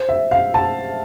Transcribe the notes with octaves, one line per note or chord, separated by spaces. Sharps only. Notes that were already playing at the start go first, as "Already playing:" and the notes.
Already playing: C5
E5
F5
A5